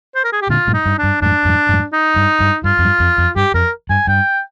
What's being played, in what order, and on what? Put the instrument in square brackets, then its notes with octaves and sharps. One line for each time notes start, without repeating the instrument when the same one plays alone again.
[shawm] C5
A#4
G#4
G4
[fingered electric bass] A#2 D3 [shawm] F4
[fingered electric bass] G2 A#2
[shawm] D#4
[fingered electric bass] G2
[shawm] D4
[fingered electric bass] G2
[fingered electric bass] F2 G#2 [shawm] D4
[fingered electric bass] F2 G#2
F2 G#2
[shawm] D#4
[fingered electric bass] G2
G2
[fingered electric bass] G2 [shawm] F4
[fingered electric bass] F2
G2
F2
F2
[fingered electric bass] G2 [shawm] G4
[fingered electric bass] F2 [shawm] A#4
[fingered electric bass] G2 [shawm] G#5
[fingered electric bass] G2 [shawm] G5